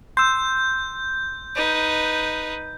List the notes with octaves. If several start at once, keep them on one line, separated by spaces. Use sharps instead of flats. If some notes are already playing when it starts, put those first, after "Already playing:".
C6 E6 G6
D#4 B4